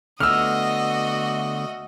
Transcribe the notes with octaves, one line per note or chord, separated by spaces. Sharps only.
D3 A3 B3 F#4 D#5 E6 F6